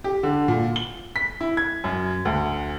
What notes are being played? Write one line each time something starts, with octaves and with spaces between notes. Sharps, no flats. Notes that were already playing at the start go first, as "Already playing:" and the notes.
G4
D3
A#2
G7
B6
E4
G#6
F#2
D2